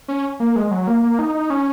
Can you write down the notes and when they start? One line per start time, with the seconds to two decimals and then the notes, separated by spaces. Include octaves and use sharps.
0.08 C#4
0.40 A#3
0.56 G#3
0.67 G#3
0.71 F#3
0.87 A#3
1.03 A#3
1.19 D#4
1.35 D#4
1.50 C#4